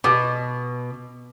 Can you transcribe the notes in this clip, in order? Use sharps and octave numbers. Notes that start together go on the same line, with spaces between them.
B2 D6